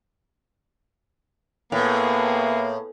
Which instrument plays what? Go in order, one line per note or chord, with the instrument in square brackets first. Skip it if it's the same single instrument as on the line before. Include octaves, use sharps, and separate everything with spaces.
[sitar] A2 [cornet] A#3 [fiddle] B3 G#4